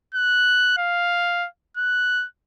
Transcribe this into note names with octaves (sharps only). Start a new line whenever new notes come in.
F#6
F5
F#6